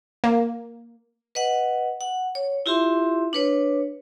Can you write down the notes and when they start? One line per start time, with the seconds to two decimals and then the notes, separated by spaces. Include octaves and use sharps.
0.24 A#3
1.35 B4 D#5 F#5
2.01 F#5
2.35 C#5
2.66 E4 F4 G4 E5 C6
3.33 D4 B4 C#5